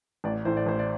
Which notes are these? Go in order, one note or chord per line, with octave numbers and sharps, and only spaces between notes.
A1 D5
A2 E3 C5
D5
A1 C5
D5